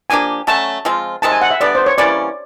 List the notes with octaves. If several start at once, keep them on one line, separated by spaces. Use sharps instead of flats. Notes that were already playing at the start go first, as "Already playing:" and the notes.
F3 A#3 D4 G4 G#5
F#3 A3 C#4 A5
F3 G#3 C4 F4
C3 D#3 G#3 C4 A5
G#5
F#5
E5
D3 G3 B3 D5
C5
C#5
E3 G3 A#3 C#4 D5